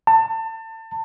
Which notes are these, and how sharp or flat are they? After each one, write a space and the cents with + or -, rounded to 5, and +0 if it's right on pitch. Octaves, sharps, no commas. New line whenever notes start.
A5 +30